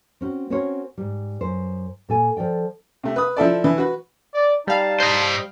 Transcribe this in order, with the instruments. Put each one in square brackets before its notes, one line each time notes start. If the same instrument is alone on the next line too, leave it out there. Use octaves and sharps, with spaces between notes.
[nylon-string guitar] C4 C#4 F#4
C4 C#4 F#4 A#4 C5 C#5
G#2 G3
F#2 C5
A#2 A4 G#5
F3 A4 D5 G5
[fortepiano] C3 A3
B4 D#6
F3 E4 A4 D5
E3
F#4 B4
[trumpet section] D5
[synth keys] G3 F5 [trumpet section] D#4 A5
[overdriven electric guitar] C5 D#5